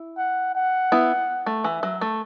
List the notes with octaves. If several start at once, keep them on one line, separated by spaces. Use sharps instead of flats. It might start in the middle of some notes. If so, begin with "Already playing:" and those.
Already playing: E4
F#5
F#5
B3 E4
A3
E3 E5
F#3
A3